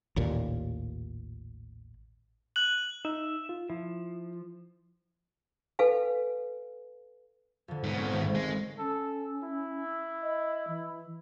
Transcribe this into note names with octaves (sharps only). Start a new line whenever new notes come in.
A1 D#2 A#2
F#6 F#7
D#4 E5
F4
F3 E4
A4 B4 F5 G#5
F2 D3
G#2 B3
C4 C#4 A#4
G#1 G6
G#3
C#4 A4
E4
D#5
E3